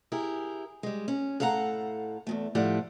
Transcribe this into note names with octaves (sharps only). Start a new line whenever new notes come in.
E4 G4 G#4 A#4
G3 G#3
C#4
A2 A4 F5 F#5 A#5
E2 A#2 A3
A2 F3 G3 D5 F#5